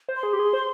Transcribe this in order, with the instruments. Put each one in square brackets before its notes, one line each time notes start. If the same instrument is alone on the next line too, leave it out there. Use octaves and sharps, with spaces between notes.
[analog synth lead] C5
[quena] C6
[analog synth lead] G#4
G4
G#4
C5